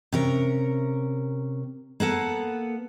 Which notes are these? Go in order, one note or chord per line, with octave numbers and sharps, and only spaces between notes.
C3 C#4 A#4
A#3 B3 A4 F#5